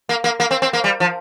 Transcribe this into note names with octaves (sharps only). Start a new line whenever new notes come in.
A#3
A#3
A#3
C4
C4
A#3
G3
F3